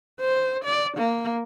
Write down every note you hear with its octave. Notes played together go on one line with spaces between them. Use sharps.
C5
D5
A#3